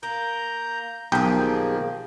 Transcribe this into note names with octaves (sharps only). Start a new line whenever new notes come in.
A#3 A#5 G6
B1 D#3 F3 A#3 G4 G#4 G5